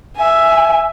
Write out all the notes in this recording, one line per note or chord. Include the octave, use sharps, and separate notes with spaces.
E5 G#5